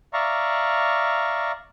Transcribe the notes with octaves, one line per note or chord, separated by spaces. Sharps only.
D5 E5 F5 A#5 C#6